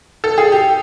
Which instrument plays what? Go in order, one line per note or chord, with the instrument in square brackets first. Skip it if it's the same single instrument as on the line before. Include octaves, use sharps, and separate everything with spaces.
[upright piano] A4
G#4
G4